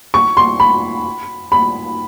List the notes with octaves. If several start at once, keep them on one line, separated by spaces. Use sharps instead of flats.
C#6
C6
B5
B5